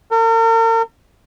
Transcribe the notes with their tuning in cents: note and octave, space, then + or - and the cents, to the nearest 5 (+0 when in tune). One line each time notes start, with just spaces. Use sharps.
A#4 -45